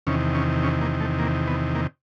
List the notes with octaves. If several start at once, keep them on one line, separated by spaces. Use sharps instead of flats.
E2 C3 D#3 C#4
C#4
C#4
A#3
A3
A#3
B3
A#3